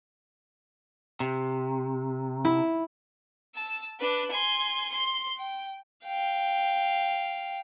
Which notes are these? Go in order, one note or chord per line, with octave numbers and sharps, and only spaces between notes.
C3
E4
A5 E6
D4 B4
G#5 C6
C6
G5
F5 G5